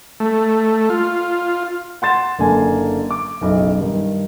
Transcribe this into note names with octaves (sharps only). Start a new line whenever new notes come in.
A3
F4
F#5 C6 A6 E7
F#1 D3 A#3 G#5 A5
D6
F#1 B1
G2 D#3